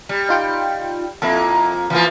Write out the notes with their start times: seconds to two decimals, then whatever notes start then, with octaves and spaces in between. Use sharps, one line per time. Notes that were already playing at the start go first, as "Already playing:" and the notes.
0.09 G3
0.29 D#4 F4 G5
1.22 F2 A#3 E4 A4
1.90 E3 F3 A#3